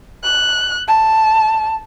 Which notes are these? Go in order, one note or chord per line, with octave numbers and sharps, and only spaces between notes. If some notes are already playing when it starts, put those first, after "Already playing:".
F#6
A5